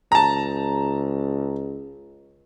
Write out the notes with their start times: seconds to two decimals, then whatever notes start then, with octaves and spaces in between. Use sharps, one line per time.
0.12 C#2 A5 A#5